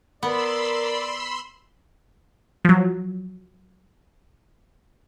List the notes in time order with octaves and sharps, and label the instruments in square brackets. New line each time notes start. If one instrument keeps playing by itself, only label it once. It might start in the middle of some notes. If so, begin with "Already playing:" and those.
[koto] B3 [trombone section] A#4 [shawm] D5 [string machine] B5 C6 E6
[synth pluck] F3 F#3